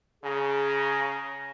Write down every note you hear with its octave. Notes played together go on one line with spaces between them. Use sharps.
C#3 G#4 G#5 A#5